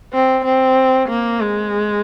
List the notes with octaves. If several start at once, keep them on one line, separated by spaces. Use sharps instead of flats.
C4
C4
A#3
G#3